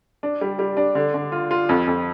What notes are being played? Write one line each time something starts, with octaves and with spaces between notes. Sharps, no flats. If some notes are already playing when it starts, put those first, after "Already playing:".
D4
G3
G3
D4
D3
D3
F4
F4
F2
F2